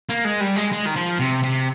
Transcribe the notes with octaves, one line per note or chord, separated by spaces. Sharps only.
A#3
G#3
G3
G#3
G#3
D#3
F3
C3
C3